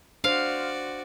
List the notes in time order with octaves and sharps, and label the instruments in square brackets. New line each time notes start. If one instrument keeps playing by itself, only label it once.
[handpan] D4 C5 [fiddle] F#4 D5 [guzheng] F5